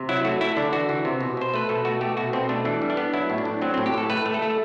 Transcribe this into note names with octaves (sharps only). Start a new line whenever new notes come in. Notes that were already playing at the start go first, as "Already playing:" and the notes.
Already playing: C3
F#3 E4
A3 F#4
A3 E4
D3 D4
E3 F#4
E3
C3
B2
B2 C5
A3 B4
B2 A4
A3 F#4
A3 G4
B2 F#4
B2 C4
A3 D4
E3 D4
G3
D4
B3
F#3 E4
A2
D4
A2
F#3 C4
C4
A2
G4
A2 A4
A3 B4
A3
A4
A3